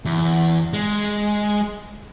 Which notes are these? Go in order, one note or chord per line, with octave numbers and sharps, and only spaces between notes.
E2
G#3